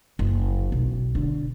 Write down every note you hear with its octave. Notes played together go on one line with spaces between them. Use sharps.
F#1
B1
D3